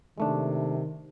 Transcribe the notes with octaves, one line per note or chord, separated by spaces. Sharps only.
C3 D#3 G#3 A3 D4